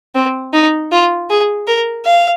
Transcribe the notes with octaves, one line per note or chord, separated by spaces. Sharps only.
C4
D#4
F4
G#4
A#4
F5